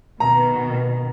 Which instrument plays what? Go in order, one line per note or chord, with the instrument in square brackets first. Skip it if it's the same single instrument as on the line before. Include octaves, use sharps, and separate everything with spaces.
[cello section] B2 D#3 [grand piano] A#5